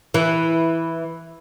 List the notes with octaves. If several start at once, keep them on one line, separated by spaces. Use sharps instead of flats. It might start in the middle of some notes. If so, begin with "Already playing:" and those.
E3